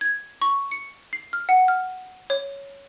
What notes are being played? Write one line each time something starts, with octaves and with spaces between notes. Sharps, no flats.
G#6
C#6
C#7
C7
F6
F#5
F6
C#5